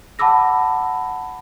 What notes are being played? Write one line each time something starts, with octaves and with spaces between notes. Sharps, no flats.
F#5 A5 B5 D6 E6 A#6